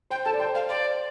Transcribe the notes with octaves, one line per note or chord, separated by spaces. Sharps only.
C5 G5
A4 A5
D5
C5 G5
C5 F5
C5 D5